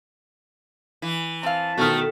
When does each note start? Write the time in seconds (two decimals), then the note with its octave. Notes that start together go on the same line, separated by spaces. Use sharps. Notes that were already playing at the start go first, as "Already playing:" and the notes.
1.02 E3
1.43 C4 F5 A5
1.78 B2 D#3 A3 F6